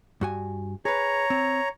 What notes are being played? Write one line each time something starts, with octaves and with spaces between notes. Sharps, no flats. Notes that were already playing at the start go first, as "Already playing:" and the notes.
G2 F#4 G#5
G#4 B4 C#5 A#5
C4